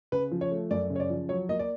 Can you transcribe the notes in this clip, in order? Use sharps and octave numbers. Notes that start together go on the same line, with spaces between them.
C#3 B4
F3
C#5
A3
F#2 D5
C#3
C#5
D5
F3
F#3 C#5
A#3 D#5
D5